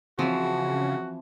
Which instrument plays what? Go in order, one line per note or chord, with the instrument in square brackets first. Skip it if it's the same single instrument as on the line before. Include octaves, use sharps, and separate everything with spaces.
[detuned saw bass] C#3 [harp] E3 C4 [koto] F3 [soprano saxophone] F#4